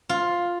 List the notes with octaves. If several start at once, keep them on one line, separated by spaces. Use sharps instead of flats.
F4